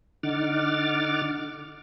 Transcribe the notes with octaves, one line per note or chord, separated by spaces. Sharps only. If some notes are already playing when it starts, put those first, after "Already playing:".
D3 D#4 F#5 D6 F6 A6